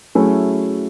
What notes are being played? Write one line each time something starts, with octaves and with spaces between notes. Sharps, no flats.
F#3 A3 C#4 E4 G#4